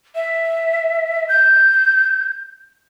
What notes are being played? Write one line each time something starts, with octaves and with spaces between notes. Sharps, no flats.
E5
G6